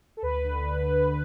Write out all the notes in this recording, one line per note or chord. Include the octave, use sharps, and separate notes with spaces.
A4
D2 B4
D3